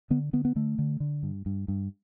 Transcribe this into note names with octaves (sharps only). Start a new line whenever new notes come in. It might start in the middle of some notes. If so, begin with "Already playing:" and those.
D3 B3
D3 B3
B3
D3 A3
D3
D3
G2
G2
G2